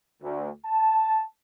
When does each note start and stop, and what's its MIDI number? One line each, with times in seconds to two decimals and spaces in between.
0.22 0.49 38
0.65 1.22 81